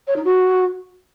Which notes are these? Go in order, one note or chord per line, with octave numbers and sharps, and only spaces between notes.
C#5
D#4
F#4